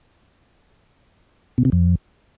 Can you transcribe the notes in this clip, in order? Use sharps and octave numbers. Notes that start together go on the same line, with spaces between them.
B2
C3
F2